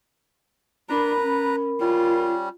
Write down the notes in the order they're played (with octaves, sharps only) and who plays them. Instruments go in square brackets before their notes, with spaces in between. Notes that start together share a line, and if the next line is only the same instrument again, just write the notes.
[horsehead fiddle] D4 [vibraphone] A#4 B5 [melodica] B4 A#5
[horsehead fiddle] C#4
[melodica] G3 C#4 [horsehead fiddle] F4